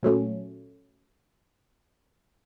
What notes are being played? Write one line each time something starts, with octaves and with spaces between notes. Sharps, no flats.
A#2 F#3 A3 C#4